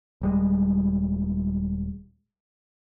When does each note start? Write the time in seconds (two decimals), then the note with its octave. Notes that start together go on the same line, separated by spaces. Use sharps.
0.22 D#1 G3 G#3